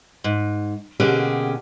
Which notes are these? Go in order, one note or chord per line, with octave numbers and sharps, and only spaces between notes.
G#2
B2 D3 A#3 C#4 G4 G#4